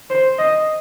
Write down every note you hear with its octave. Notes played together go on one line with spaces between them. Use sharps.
C5
D#5